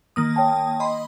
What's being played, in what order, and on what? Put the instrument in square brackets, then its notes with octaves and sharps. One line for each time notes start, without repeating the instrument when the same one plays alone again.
[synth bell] D#3 A#3 D#6
[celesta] C#5 G5 A5
[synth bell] D#5 B5 C6